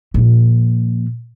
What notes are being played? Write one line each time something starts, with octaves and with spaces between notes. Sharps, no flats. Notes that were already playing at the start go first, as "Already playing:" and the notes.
A#2 F3